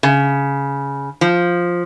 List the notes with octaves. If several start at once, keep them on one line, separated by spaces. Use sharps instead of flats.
C#3
F3